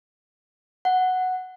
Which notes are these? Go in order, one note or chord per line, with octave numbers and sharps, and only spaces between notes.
F#5